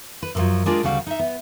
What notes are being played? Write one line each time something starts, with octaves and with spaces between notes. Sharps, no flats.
B4
F#2 A#2 D#3 F3 F#3
G#3 D4 F4 G#4 A#4 D5
D2 C#3 G3 F#4 F5
D#4 E5
B3